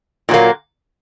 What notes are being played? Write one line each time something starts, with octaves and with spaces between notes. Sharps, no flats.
A#2 F#3 A#3